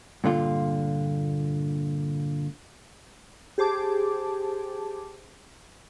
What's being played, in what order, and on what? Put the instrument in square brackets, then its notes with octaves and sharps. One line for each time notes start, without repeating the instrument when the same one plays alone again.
[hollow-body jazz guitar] G2 A#2 D3 F4
[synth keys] G4 G#4 C5 A5 D6